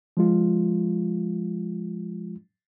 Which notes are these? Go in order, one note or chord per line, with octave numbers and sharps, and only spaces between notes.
F3 G#3 F4